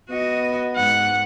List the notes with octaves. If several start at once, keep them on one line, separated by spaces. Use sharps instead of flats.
B3 F#4 D#5
G#2 F#5